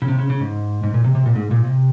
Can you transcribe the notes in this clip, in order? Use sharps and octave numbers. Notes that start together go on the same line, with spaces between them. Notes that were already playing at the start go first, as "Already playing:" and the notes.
C#3
C3
C#3
C#3
G#2
G#2
A#2
C3
C3
A#2
G#2
A#2
C3